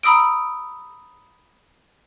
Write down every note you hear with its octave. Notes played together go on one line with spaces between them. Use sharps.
A#5 B5 D#6 E6 D7